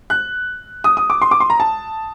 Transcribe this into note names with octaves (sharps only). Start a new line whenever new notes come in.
F#6
D#6
D#6
D6
C6
D6
C6
A#5
A5